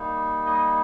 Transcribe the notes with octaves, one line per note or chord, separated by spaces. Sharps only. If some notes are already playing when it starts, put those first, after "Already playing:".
Already playing: G3 A#3 D#4
D#5